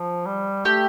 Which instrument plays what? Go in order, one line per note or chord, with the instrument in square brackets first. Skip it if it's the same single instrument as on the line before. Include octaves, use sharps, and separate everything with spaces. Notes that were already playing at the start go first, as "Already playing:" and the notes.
Already playing: [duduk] F3
G3
[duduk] A3 [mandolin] G4